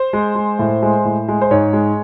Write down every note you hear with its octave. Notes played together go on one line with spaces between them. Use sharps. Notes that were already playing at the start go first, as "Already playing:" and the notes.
Already playing: C5
G#3
G#3
A2
G#3
A2
G#3
C5
G#2 C#5
G#3